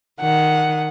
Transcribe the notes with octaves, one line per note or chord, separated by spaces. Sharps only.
D#3 F#5